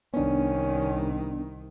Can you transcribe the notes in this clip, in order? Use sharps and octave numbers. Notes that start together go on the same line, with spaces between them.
C2 D#3 B3 C#4 D4